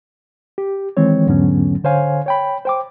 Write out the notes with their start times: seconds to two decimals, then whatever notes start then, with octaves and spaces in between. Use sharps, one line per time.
0.58 G4
0.97 D#3 E3 G#3 C4 C#5
1.27 E2 G#2 D3 F#3 B3 C#4
1.84 D3 C5 C#5 F5 G#5
2.26 C#5 G5 B5
2.65 C5 G5 D6